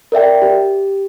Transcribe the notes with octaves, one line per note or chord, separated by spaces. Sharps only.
A#4 D5 E5 G5
G4